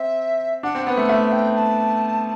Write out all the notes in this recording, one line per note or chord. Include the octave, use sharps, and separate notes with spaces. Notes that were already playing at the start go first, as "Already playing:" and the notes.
Already playing: C4 E5
D4 F#5
C4
B3 F#5
A3
A3 E5
G5
A5